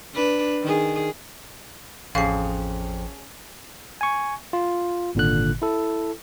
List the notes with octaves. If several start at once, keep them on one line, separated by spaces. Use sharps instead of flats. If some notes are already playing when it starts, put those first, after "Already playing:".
D4 B4
D#3 G#4
A1 F2 C#4 G#4 F5 C7
G#5 C#6
F4
G#1 A#2 D3 F#6
E4 A4